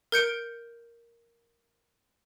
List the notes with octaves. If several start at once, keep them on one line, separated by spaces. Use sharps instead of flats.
A#4 G6 C#7 D7